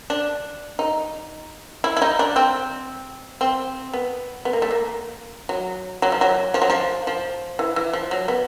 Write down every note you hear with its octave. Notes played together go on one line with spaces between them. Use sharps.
D4
D#4
E4
E4
D#4
D4
C4
C4
B3
B3
A#3
A3
A#3
F#3
F#3
F3
F#3
F3
F#3
F3
F3
E3
E3
F3
F#3
B3